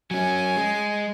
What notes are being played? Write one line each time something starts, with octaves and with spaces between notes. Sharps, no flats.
F#3 C#4 G#5
G#3